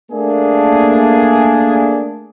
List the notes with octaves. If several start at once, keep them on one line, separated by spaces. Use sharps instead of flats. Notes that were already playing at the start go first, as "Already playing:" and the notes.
A3 A#3 D4 G#4